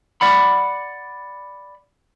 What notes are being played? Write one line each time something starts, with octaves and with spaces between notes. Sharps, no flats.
D5 F#5 B5